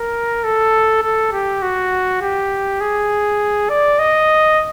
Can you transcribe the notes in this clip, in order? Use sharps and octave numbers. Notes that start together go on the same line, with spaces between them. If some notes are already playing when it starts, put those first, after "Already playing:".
Already playing: A#4
A4
A4
G4
F#4
G4
G#4
D5
D#5